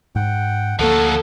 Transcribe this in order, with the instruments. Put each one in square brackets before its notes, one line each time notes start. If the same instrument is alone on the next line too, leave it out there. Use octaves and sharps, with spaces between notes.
[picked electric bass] G#2 [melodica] F#5 G5
[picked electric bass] D2 A#3 [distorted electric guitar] F3 F#3 [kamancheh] A4 [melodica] F#5